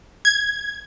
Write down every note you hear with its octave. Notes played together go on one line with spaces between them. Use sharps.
G#6